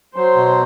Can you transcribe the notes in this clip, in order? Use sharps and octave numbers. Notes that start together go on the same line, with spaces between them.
F#3 C5
B2